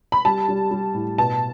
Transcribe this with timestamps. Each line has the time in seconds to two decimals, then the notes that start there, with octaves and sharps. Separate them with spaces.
0.12 B5
0.25 G3 A5
0.49 G3
0.71 G3
0.94 A2
1.18 B2 A5